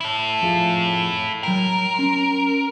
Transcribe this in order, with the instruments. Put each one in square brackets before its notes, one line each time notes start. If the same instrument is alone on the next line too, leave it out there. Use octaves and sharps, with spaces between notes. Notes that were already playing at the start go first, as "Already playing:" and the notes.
[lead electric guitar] E4 A4
[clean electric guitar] F2 F4 G#4
[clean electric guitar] F#3 G5 [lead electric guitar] A#4
[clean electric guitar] C#4 C6